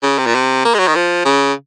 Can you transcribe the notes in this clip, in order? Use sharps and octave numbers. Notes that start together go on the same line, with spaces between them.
C#3
C3
A#2
C3
A#3
G#3
F#3
D#3
F3
C#3